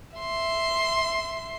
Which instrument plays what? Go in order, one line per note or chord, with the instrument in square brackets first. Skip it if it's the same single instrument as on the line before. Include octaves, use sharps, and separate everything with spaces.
[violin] E5 C6